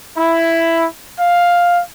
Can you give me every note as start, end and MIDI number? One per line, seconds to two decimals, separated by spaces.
0.18 0.85 64
1.20 1.81 77